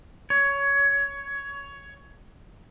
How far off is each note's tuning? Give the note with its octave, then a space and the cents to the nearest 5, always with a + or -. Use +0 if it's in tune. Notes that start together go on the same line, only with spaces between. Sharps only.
C#5 +15